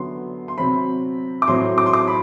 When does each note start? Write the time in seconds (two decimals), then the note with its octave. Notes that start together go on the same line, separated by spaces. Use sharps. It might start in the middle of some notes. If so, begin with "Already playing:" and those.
Already playing: D3 F#3 B3 C6
0.48 C6
0.58 C3 F#3 C4 B5
1.42 D6
1.47 A2 F#3 C4 C6
1.78 D6
1.86 C6
1.93 D6
2.08 B5